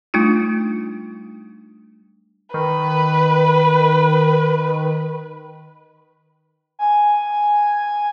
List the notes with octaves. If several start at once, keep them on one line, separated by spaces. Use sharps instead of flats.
G3 A3 D4 D#4 F4
D#3 B4
G#5